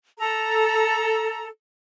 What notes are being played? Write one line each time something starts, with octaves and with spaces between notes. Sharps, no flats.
A4 A#5